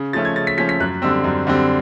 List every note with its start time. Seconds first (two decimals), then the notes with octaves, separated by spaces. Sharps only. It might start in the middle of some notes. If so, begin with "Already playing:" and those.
Already playing: C#3
0.13 F3 A3 C#4 A6
0.25 G#6
0.36 C#3 A6
0.47 B6
0.57 F3 A3 C#4 B6
0.69 B6
0.80 F#2 F#6
1.02 D3 G3 C4 E6
1.24 F#2
1.47 D3 G3 C4